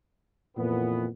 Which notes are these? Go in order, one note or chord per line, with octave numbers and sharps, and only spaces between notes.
F2 A#2 E3 B3